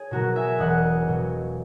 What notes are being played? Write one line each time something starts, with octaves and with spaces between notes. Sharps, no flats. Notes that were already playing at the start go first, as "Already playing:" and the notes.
Already playing: G#4 C#5
B2 F#3 F#4 A#4
E5 G#5
E1 D#5 F#5
B2 F#3